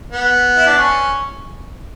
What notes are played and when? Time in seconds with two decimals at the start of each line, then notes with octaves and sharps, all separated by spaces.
0.12 B3
0.56 E4
0.67 D4
0.77 C#4